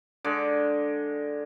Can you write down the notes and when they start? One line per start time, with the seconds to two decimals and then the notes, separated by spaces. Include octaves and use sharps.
0.24 D3 G#3 D6